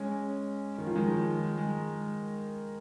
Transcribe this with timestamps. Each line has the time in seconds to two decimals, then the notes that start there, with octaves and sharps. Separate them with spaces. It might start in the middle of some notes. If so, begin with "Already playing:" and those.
Already playing: G#3 C#4
0.78 D#3
0.87 F3
0.95 D#3 G#3
1.58 G#3